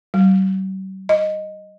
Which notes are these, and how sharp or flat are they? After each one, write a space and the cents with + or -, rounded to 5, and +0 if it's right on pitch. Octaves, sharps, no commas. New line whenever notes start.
G3 -45
D#5 -5